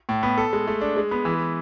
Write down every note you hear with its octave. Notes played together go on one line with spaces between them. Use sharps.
A2
B3
A4
G#3
A3
D4
G#3
B3
E3